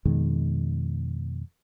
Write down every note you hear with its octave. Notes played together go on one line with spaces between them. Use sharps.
F2 B2 D#3 G#3